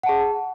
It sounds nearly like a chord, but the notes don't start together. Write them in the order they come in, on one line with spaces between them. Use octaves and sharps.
F#5 A5 G#4